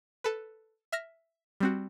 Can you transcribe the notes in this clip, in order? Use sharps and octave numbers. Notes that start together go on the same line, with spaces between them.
A4 B4
E5 F6 A#6
G3 C4 F#4